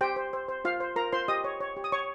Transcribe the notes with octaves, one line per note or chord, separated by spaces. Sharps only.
G4 C5 G5
C5
C5
C5
F4 C5 F5
C5
F4 A#4 A#5
F4 C5 C6
G4 D#5 D#6
C#5
C#5
G4
D#6
C#5 C#6